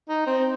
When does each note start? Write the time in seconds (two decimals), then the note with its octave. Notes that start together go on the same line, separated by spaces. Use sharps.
0.09 D#4
0.27 C4